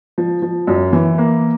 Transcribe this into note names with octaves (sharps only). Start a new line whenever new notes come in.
F3
F3
F#2
E3
A#3